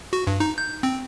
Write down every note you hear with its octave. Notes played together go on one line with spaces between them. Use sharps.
F#4
G2
D#4
G6
C4